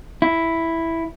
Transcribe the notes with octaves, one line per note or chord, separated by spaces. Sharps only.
E4